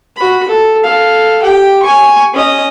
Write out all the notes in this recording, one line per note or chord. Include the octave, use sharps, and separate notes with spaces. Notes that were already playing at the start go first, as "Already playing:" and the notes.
F#4 B5
A4
A4 F5
G4 G5
G#5 C#6
C#4 D#5